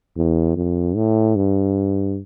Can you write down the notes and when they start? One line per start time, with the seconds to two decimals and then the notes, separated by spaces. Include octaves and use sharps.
0.17 E2
0.56 F2
0.96 A2
1.36 G2